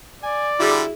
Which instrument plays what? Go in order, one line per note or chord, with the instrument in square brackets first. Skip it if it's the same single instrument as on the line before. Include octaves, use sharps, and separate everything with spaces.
[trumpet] D5 [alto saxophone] G#5
[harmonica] D3 G3 [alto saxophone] E4 [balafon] F#4 G#4